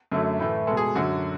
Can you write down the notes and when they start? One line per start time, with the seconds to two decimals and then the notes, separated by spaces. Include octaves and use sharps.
0.12 F#2 D3 F#3 A3
0.40 A2 E3 A3
0.67 G#3 A4
0.71 B2
0.77 G#4
0.95 F#2 D3 F#3 F#4